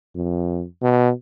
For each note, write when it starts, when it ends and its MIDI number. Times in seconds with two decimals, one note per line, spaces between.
0.15 0.64 41
0.82 1.11 47